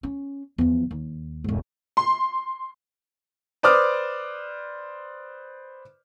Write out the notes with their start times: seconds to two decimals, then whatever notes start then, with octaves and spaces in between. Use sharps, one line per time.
0.03 C#4
0.58 E2 F3
0.91 D#2
1.44 E1 G#2
1.97 C6
3.63 B4 C5 D5 D6 D#6 F6